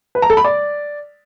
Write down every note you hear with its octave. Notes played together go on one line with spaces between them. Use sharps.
B4
A#5
A4
B5
D5